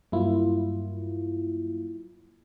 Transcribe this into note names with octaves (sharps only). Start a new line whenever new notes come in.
G2 F#3 A#3 E4 F4